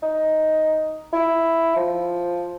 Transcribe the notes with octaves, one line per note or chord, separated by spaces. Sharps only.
D#4
E4
F3